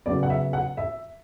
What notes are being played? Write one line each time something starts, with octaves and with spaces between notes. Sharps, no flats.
C#3 F#3 B3 D5
F#5
E5
F#5
E5